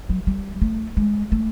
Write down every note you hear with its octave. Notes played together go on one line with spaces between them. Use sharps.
F#3
G3
A3
G#3
A3